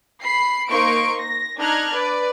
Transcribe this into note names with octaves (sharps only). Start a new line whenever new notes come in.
B5 C7
A#3 D#4 C5 C6 C#6 D7
A#6
D4 D#4 A#5 F6 F#6 G#6
B4 D5